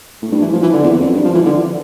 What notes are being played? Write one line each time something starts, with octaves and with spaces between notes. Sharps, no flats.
A2
G2
E3
F3
E3
D3
E2
F2
G2
F3
E3
D3